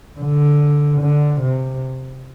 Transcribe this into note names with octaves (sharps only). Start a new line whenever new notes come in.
D3
D3
C3